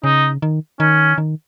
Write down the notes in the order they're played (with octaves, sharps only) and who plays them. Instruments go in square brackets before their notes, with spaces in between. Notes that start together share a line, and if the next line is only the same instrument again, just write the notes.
[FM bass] C#3 [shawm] D#4
[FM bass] D#3
[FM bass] D#3 [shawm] C#4
[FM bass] D#3